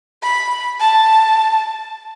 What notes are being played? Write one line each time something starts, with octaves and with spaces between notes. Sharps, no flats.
B5
A5